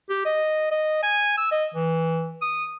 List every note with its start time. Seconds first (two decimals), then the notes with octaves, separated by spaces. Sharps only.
0.10 G4
0.26 D#5
0.71 D#5
1.03 G#5
1.38 E6
1.52 D#5
1.74 E3
2.42 D#6